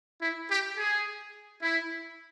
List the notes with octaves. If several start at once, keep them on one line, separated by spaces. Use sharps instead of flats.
E4
G4
G#4
E4